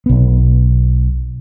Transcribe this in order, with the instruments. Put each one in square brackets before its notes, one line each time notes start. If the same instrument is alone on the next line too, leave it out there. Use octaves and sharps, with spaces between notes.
[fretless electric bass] B1 B3